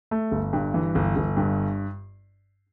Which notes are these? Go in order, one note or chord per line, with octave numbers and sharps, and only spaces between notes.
A3
G1
G2
E3
G1
G1
G2